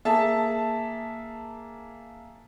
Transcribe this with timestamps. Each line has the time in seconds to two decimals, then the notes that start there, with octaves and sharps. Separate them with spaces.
0.05 A#3 G#4 E5 A5